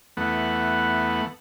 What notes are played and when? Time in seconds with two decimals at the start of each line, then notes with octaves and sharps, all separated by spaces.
0.17 E2 A3 B3 F#5